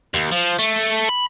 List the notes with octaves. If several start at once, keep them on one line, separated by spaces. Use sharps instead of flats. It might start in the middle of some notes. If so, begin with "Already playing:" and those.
D#2
F3
A3
B5